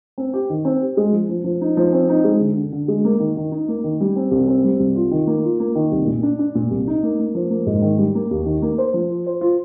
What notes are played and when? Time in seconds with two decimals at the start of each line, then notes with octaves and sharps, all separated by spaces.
0.18 C4
0.34 G4
0.50 D#3
0.65 C4
0.81 G4
0.97 G#3
1.13 F3
1.29 F3
1.44 F3
1.61 D#4
1.77 F3
1.93 C4
2.09 D#4
2.24 G#3
2.40 D3
2.57 D3
2.72 D3
2.88 G#3
3.05 A#3
3.20 D#3
3.37 D#3
3.52 D#4
3.68 A#3
3.84 D#3
4.01 G3
4.16 C4
4.31 C2
4.48 C4
4.64 G3
4.80 C2
4.96 F4
5.11 D#3
5.27 A#3
5.43 F4
5.60 A#3
5.75 D#3
5.92 C2
6.07 A#2
6.23 D4
6.39 D4
6.55 A#2
6.71 C2
6.87 D#4
7.03 A#3
7.19 A#3
7.35 F3
7.50 A#3
7.66 G#2
7.82 D#3
7.98 G3
8.15 A#3
8.31 D#2
8.46 D#3
8.62 A#3
8.78 C5
8.94 F3
9.10 F4
9.27 C5
9.41 F4